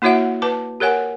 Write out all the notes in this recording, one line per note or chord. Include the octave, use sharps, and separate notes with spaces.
A#3 E4 F#4 C#5 E5 F#5
B4 A5 D6
G4 A#4 C#5 F#5 G#5